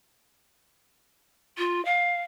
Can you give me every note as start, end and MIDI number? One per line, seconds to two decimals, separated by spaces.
1.58 1.83 65
1.85 2.21 77